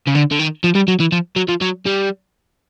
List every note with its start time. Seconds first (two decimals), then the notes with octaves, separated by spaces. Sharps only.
0.07 C#3
0.15 D3
0.31 D3
0.39 D#3
0.64 F3
0.75 G3
0.88 F#3
1.00 E3
1.12 F3
1.36 F#3
1.48 F3
1.61 F#3
1.86 G3